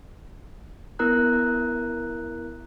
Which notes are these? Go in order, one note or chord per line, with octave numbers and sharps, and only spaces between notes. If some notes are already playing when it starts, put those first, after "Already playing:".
B3 E4 A#4 A#5 F#6